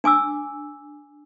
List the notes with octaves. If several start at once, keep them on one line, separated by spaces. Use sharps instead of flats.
D4 G#5 D6 E6